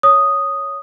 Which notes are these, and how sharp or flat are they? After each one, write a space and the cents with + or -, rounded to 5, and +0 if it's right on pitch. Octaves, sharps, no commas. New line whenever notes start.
C#5 +0 D#6 +0